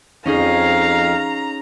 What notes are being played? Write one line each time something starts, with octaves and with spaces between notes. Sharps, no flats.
F2 C#4 D#4 G#4 F5 A#5